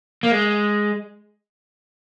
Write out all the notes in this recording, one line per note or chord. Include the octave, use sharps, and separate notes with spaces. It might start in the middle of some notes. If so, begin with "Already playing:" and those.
A#3
G#3